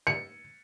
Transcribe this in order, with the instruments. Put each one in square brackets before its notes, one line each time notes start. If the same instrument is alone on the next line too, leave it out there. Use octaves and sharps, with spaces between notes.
[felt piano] C#7